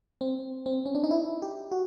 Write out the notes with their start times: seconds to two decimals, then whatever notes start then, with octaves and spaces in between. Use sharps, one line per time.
0.21 C4
0.66 C4
0.86 C#4
0.95 D4
1.04 D#4
1.11 E4
1.42 G4
1.71 F#4